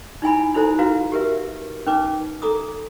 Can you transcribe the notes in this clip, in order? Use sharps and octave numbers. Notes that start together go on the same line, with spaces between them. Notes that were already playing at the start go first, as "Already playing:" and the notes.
D#4 E4 G#5 B5
D#4 E4 A4 C5 A#5
E4 F#4 B4 F5 A#5
G4 G#4 A#4 B4 E5
C#4 D#4 B4 D6
A4 A#5 D6 D#6